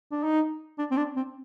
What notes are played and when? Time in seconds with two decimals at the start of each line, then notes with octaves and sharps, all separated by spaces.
0.12 D4
0.24 D#4
0.79 D4
0.91 C4
0.97 D4
1.16 C4